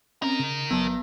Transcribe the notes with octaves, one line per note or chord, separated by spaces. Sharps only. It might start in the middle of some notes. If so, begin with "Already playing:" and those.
C4 C#4 D#4 A#4
C#3
G1 F#3 B3 A5